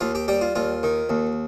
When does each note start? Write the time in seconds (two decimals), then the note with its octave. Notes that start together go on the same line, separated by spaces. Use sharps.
0.01 D#2 F4
0.15 G4
0.28 G3 G4
0.41 F4
0.55 D#2 F4
0.83 D#3
1.09 D#2